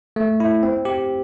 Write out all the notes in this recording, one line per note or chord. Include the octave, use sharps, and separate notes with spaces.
A3
E4
C4
G4